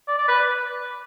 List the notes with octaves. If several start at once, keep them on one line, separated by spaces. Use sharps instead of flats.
D5
D5
B4